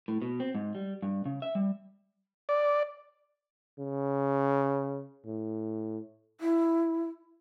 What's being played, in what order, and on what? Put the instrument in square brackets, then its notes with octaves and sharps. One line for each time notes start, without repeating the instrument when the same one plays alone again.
[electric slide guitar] A2
B2
C4
G#2
G3
G2
C#3
E5
G3
[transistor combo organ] D5
[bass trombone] C#3
A2
[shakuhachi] E4